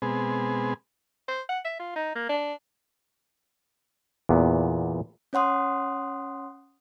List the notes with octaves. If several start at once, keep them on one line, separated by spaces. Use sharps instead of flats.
B2 G#3 B3 C4 G#4
C5
F#5
E5
F4
D#4
A#3
D4
E2 A#2 B3
C#4 C#5 F#5 C6 D#6